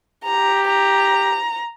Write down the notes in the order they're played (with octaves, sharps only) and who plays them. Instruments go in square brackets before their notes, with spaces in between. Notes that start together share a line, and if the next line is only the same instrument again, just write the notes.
[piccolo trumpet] G4 [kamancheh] A#5
[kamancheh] A#5